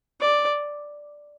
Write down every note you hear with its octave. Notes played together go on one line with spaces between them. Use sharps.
D5